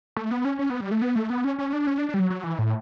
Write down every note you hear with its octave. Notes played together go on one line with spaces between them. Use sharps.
A3
B3
C#4
C#4
B3
G3
A3
B3
A3
B3
C#4
C#4
D4
C#4
D4
D4
G3
F#3
F#3
E3
A2